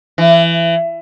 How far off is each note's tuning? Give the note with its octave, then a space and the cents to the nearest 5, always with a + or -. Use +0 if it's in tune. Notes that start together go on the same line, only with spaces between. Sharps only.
E3 +25